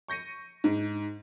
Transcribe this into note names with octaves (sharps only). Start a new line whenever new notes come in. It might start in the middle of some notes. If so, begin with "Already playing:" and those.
C#6 G6 A#6 C#7 D#7
G#2